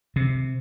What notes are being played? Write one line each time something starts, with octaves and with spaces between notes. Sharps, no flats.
C3